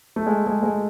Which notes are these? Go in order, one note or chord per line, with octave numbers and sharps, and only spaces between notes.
A3
G#3
G#3
G#3